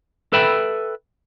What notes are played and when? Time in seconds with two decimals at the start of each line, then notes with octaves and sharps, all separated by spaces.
0.33 A4 B4 E5 G5 B5